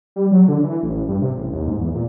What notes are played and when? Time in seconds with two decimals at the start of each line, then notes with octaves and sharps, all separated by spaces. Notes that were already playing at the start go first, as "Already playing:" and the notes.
0.16 G3
0.31 F#3
0.48 D3
0.64 E3
0.83 A1
1.08 G2
1.22 C3
1.37 A1
1.52 D#2
1.67 G#2
1.81 E2
1.95 A#2